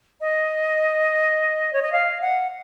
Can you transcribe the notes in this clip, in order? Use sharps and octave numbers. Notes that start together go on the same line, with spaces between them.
D#5
C#5
D#5
F5
F#5